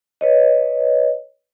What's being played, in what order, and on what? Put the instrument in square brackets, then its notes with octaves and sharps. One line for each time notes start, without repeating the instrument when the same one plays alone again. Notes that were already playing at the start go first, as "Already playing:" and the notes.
[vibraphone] B4 C#5 D#5